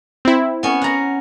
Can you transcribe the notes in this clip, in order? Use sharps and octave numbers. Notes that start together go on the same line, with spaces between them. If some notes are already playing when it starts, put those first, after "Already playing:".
C4 E4
B3 C#4
F#5 A#5